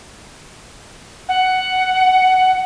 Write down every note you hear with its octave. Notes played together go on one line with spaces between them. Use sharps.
F#5